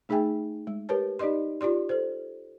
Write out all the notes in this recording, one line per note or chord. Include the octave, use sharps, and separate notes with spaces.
A3 D#4 G#4 E5 G5 G#5
G#3
G4 A#4 B4 C#5 A5
D#4 G4 D5 D#5 C6
F4 G4 D5 C6
A4 C5